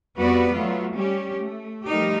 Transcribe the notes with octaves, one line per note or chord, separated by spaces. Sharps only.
F2 G3 B3 F#4 B4 D5
F#3 A3 B3 F4
G3 C#4 G4
A3
F3 G3 A3 D#4 G4 A#4